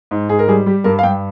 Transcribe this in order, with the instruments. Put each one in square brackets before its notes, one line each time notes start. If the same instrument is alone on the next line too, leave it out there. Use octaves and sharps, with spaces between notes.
[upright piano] G#2
G#2 G#4
A#4
G3 G#4
G3 G4
G2 A#4
F5
G2 G5